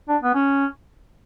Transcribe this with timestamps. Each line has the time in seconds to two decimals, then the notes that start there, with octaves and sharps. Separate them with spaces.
0.09 D4
0.23 B3
0.35 C#4